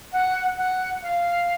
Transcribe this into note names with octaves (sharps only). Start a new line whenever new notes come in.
F#5
F#5
F5